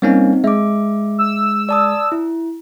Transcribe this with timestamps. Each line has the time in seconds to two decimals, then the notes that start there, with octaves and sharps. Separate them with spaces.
0.02 G3 A#3 C4 C#4 D#4
0.44 G#3 E5 D6
1.18 E6
1.69 D5 A5 D#6
2.12 E4